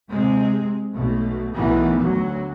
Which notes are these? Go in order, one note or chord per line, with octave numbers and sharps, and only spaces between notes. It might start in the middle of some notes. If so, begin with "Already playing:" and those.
C3 G#3 C4
B1 B2 A3
B1 D#3 E3 A3 B3
D2 F#3